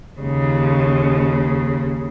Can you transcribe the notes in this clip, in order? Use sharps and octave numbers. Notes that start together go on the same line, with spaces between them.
D#2 C#3